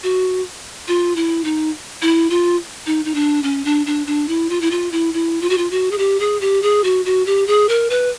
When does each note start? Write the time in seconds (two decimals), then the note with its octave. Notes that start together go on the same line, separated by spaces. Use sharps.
0.03 F#4
0.88 F4
1.16 E4
1.44 D#4
2.02 E4
2.30 F4
2.86 D#4
3.05 D#4
3.15 D4
3.43 C#4
3.65 D4
3.86 D4
4.07 D4
4.28 E4
4.50 F4
4.61 E4
4.71 F4
4.92 E4
5.14 E4
5.41 F4
5.49 F#4
5.58 F4
5.71 F#4
5.91 G#4
5.98 G4
6.20 G#4
6.41 G4
6.62 G#4
6.84 F#4
7.05 F#4
7.26 G4
7.47 G#4
7.69 A#4
7.90 B4